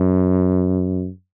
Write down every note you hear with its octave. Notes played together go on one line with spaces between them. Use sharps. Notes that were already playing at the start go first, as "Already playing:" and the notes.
Already playing: F#2